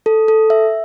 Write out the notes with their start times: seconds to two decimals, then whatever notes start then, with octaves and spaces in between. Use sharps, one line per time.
0.06 A4
0.28 A4
0.50 E5